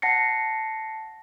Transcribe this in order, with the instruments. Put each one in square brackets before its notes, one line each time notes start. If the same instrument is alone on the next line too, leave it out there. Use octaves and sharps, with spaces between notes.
[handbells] F#5 A5 A#6 C7 C#7